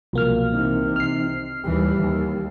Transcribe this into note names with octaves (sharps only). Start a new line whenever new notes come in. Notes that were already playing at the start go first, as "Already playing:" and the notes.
C2 B2 F3 F#3 A#3 F6
C3 E3 C4 D#4
F6 C7
D#2 E3 G3 G4
D#2